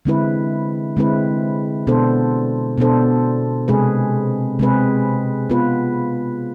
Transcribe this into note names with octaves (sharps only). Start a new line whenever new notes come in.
D3 G#3 C4 E4 B4
D3 G#3 C4 E4 B4
B2 B3 D4 A4 C5
B2 B3 D4 A4 C5
C3 G#3 C4 G#4 B4
C3 G#3 C4 G#4 B4
B3 F4 B4